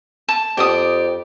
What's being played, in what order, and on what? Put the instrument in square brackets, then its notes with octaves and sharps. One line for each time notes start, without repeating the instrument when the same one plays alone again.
[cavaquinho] A5
[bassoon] F2 [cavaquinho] G4 D5 D#6